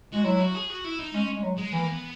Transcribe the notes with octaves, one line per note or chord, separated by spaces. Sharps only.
G#3 F#4
F#3 E4
F#4
G#4
F#4
E4
D#4
G#3 C#4
G#3
F#3
G#3
E3 A#3
B3